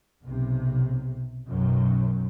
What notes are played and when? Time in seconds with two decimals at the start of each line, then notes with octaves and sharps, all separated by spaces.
0.22 B1 C3
1.48 B1 F#2 D#3 F#3